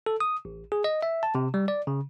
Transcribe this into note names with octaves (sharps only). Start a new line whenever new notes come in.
A4
D#6
A1
G#4
D#5
E5
A5
C3
G3
D5
C#3